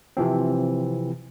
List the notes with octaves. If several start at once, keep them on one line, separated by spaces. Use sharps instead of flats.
C3 E3 F3 C4